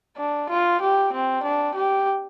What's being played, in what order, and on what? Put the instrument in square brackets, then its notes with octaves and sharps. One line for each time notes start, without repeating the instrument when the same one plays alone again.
[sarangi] D4
F4
G4
C4
D4
G4